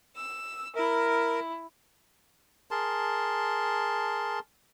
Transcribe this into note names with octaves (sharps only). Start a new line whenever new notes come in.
E6
E4 A#4
G#4 A#4 A5 C6